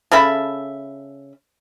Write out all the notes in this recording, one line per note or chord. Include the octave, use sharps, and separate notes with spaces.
C#3 A4 E5 B5